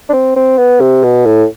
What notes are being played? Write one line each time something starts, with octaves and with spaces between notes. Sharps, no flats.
D4
C4
C4
B3
C3
B2
A2